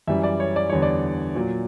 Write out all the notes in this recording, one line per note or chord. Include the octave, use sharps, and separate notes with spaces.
F#2 E3 G3 E5
D5
C#5
D5
E2 D3 G3 C#5
D5
A#2 F#3